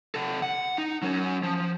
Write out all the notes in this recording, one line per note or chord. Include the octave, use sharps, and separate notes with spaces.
C3 A4
F#5
D#4
F#3 C#4
F3